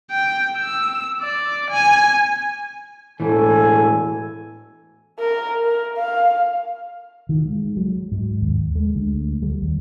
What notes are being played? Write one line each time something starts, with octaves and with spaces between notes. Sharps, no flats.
G5
E6
D5
G#5
E1 A2 E3 A4 G#5
A#4
A#4
F5
D#3
G#3
F#3
G#2
D#2
G#3
D2
G3
D#2